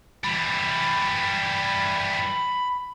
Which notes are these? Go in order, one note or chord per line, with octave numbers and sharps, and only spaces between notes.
E3 G3 B5